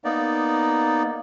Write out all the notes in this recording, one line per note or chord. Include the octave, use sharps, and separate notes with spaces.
A#3 B3 D#4 D5